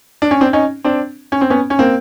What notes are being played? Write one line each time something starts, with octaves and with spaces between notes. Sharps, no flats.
D4
C#4
C4 D4
C#4 D#4
C4 D4
C#4
C4
B3 C#4
C#4
A#3 C4